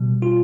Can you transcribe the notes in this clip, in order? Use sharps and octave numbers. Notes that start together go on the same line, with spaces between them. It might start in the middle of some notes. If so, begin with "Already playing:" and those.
Already playing: B2 G3
F4